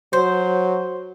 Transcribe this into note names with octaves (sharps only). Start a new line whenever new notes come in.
F#3 C5